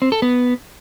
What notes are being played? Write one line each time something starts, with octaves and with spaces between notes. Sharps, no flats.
C4
A4
B3